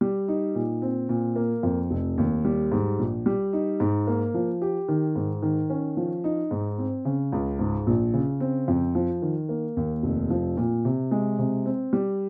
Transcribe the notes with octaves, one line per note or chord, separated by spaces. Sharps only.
G3
D#4
A#2
C4
A#2
A#3
F2
F1
D#2
G3
G#2
A#1
G3
D#4
G#2
A#3
F3
G4
D#3
G#2
D#3
C#4
F3
D#4
G#2
C4
C#3
C#2
G#2
A#1
C#3
C4
F2
F3
D#3
A#3
D#2
F1
F3
A#2
C3
G#3
C3
C4
G3